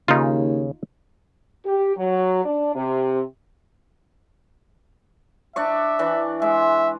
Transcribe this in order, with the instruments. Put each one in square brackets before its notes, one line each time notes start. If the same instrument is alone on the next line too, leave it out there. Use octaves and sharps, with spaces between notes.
[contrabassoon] D#2 [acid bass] C#3 [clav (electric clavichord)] D#4 F4
[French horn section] G4
F#3
D4
C3
[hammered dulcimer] D4 D5 C#6 [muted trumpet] E5
[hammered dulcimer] E3 D4 D5
[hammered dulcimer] G#3 [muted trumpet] E5